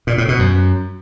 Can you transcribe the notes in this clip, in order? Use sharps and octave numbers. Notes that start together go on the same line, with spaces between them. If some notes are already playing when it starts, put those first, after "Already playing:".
A#2
A2
B2
F#2